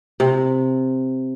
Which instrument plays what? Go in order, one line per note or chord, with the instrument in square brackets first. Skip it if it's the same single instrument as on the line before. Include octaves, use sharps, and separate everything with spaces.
[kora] C3